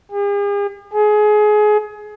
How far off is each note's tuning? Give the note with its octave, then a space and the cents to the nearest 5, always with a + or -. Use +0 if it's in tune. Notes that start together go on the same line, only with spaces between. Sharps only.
G#4 -45
G#4 +25